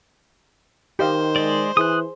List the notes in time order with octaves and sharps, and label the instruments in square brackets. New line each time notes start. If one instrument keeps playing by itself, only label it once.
[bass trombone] D#3 [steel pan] G4 D#5 F5 [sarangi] C5
[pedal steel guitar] G#3 D5
[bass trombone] E3 [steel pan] G#4 [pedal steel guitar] D#6 F#6